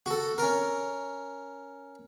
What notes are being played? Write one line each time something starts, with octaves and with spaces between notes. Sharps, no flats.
F#4 A4
C#4 A#4